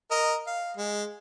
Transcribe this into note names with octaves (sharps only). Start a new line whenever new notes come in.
A#4 D#5
F5
G#3